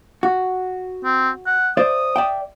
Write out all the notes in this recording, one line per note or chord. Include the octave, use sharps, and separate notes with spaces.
F#4
C4
F#5
C5 D5 E5 D#6
D5 E5 G5